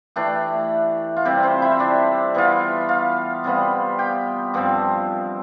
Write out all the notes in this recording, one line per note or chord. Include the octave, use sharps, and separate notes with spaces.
E3 A3 D4 G4
F4
C3 G3 C4 G4
C4 C5
E4 E5
D4 D5
E3 B3 F4
F4 F5
C3 G3 B3 F4
G4 G5
G2 F3 C4